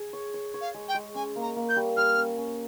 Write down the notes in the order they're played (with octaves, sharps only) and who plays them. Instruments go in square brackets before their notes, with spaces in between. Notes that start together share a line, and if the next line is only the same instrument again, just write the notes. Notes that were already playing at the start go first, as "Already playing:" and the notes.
Already playing: [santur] G#4
C#5
C#5
C#5
[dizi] F5
[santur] G#3
[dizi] G5
[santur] G#3
[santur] C#4 [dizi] G#5
[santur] A#3
[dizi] A#5
[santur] A#3
[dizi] G6
[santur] G3
[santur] G3 [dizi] F6
[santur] C#4
C#4